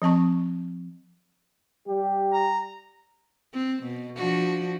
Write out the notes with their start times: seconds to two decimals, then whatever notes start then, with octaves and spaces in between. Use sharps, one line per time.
0.02 F3 C4 A5 C#6
1.88 G3 G4
2.33 A#5
3.53 C4
3.83 B2
4.16 F3 D4 F#4